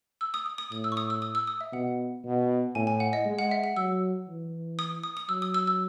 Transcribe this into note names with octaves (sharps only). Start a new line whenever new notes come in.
E6
D#6
D#6
D#6
A2 D#6
E6
C#6
D#6
E6
D#6
E6
D#6
E5
B2 F#5
B2
A2 G#5
G#5
F#5
D#5
G#3
F#5
E5
F#5
F#3 E6
E3
D#6
D#6
D#6
F#3 E6
D#6
E6
E6